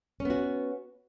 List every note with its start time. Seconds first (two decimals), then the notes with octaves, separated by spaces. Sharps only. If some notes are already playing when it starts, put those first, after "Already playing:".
0.20 C#4
0.25 B3
0.30 F#4